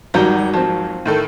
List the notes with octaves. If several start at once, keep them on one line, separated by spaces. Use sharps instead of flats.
G#1 F#3 G3 D#4 F#5 G6
F3 C4
A2 D#3 A4